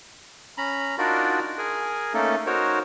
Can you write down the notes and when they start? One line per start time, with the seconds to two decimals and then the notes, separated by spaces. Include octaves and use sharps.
0.58 C#4 A#5 B5
0.98 D4 D#4 F4 F#4 A#4 D5
1.58 G#4 A#4 G#5
2.14 A3 A#3 C#4 D#4 A4
2.46 D#4 F#4 A#4 C5 C#5